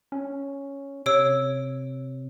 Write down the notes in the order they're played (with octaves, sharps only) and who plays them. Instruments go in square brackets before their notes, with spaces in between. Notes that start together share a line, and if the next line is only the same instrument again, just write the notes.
[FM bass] C#4
[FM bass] C3 [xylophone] C#5 E6 D7